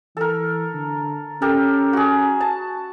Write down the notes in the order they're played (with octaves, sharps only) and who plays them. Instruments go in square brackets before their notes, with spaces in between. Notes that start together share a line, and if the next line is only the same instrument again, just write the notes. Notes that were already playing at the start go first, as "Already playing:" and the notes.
[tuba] E3 [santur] A4 A#4
[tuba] D3
[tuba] C#4 [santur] G4 A4 A#4
[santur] F#4 G#4
A5